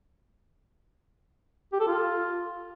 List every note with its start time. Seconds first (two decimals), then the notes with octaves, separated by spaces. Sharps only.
1.73 G4
1.80 A4
1.87 F4